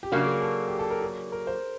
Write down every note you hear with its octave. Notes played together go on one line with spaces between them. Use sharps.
G4
C#3 F#3 A#3 D4 F#4
G#4
A4
G4
A4
A#4
G#4
A#4
C5